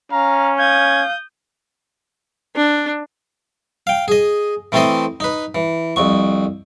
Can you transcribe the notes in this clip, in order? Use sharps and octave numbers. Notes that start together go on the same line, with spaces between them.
C#4 F5 A#5
F5 D#6 G6 G#6
D4
F5 G5
G#4 D#5
E3 A3 C4 A4 C5 D#5
D#4 B4
E3
C2 F2 C#6